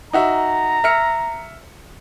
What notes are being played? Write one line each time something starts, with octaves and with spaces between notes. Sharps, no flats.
D#4 F#4 E5 A#5
E5 F6 C#7